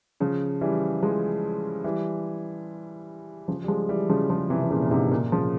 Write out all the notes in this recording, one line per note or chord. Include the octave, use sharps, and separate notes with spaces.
C#3 F3
E3 G3
F3 G#3
E3 G3
C#3 F3
G3
F3 G#3
E3 G3
C#3 F3
C#3 F3
C3 E3
E3
A#2 C#3
A#2
G#2 C3
A#2 C#3
C#3 F3